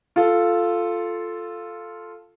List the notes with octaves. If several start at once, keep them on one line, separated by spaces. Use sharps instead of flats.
F4 A4